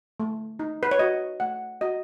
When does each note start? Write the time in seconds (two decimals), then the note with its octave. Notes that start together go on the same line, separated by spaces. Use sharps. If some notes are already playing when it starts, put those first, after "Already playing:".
0.20 A3
0.59 D#4
0.83 B4
0.91 C#5
0.99 F#4 D#5
1.40 A3 F#5
1.81 F#4 D#5